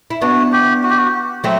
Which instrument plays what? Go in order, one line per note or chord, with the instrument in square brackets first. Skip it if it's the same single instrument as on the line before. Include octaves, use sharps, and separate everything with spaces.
[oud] E4
[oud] B3 D4 [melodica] F#4
[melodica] G4
F#4
G4
F#4
[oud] F#3 A3 [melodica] C4